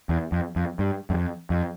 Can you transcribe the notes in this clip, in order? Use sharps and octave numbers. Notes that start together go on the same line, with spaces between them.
E2
F2
F2
G2
F#2
F2
F2